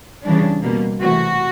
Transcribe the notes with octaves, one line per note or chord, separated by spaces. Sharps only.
C#3 E3 G3 D4
B2 G3 A#3
C3 E3 A3 F#4